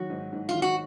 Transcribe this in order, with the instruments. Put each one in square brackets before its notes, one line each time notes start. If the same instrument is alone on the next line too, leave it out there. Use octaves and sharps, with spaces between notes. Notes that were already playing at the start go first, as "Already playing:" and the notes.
Already playing: [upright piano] D#3 F#3 [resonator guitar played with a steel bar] F#4
[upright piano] G#2
G#2
[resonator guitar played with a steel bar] F4
[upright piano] D#3
[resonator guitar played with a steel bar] F#4